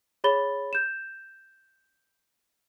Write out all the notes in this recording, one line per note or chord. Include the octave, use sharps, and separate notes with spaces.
G#4 C#5 B5 A6 G7
G6 E7